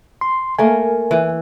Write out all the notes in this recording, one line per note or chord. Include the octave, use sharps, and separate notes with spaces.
C6
A3 A#3 A#4 G#5
E3